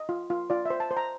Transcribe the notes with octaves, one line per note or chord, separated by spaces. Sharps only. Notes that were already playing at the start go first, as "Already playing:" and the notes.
Already playing: D#5
F4
F4
F4 D5
C5 E5
A5
C5
A#5